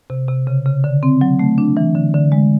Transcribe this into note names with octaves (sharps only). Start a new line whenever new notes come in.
C3
C3
C#3
C#3
D3
C4
F#3
A3
D4
E3
D3
D3
G#3